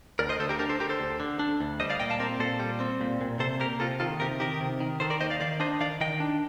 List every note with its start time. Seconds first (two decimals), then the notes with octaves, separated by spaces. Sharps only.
0.19 D2 A#4 D5
0.29 C5 D#5
0.40 D2 A4 C5
0.49 G4 A#4
0.59 D4 G4 A#4
0.69 A4 C5
0.80 D3 G4 A#4
0.89 A4 C5
1.00 D2
1.20 D3
1.39 D4
1.61 D2
1.80 G3 C5 D#5
1.90 D5 F5
2.00 A#2 D#5 G5
2.10 F5 A5
2.20 C4 A#4 D5
2.39 A#2 A4 C5
2.60 G3
2.80 C4
3.01 A#2
3.21 A#2
3.40 C3 A4 C5
3.60 A#3 G4 A#4
3.80 C3 F4 A4
4.00 D#3 F4 A4
4.20 C3 G4 A#4
4.40 D#3 G4 A#4
4.61 C3
4.80 D#3
5.00 D#3 A4 C5
5.10 A#4 D5
5.21 D#2 C5 D#5
5.30 D5 F5
5.41 D#3 D5 F5
5.60 D4 C5 D#5
5.80 D#3 D5 F5
6.01 D#3 D#5 G5
6.20 D4